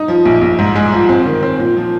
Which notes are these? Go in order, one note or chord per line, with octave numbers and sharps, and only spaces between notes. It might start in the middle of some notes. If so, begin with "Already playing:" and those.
Already playing: D#4
F3
A#1
A#1
G#2
G#3
F3
C4
D#3
C4
A#2
F3